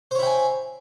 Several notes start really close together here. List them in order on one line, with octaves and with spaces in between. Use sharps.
C5 C#5 E4 G5 G#5